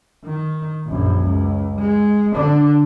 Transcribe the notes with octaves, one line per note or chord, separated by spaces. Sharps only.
D#3
A#1 F#2
C#2
G#3
D3 D4